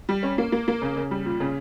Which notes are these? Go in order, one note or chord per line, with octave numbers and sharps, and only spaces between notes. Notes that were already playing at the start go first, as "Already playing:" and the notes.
G3
C#4
A#3
A#3
A#3
C#3
C#3
G3
A#2
C#3